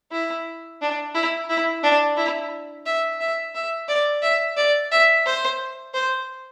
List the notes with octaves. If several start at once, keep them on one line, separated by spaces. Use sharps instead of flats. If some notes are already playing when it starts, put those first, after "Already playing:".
E4
D4
E4
E4
D4
E4
E5
E5
E5
D5
E5
D5
E5
C5
C5